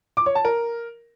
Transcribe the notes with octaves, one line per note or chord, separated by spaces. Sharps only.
D6
C#5
A5
A#4